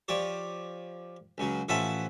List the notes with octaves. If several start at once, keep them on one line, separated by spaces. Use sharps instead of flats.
F3 G4 C#5 D5
C#2 C#3 F#3
A1 F3 C#4 E5 F#5 A5